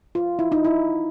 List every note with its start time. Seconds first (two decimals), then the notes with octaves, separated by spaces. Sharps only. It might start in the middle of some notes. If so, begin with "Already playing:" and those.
0.15 F4
0.39 E4
0.52 D#4
0.64 E4